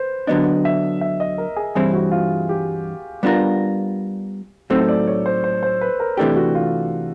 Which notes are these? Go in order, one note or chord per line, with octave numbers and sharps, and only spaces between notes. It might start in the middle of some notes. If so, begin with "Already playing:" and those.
Already playing: B4 C5
D3 F#3 B3 D4 D#5
E5
E5
D#5
A#4
G#4
G2 E3 G3 C4 E4 G#4
F#4
F4
G4
G3 B3 D4 F4 A#4
A2 F#3 A3 C4 D#4 A4
D5
C#5
C5
C5
C5
B4
A#4
C3 E3 A3 D4 G4 A4
F#4
F4